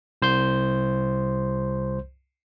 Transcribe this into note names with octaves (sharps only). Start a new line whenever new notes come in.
C2 C5 C6 G6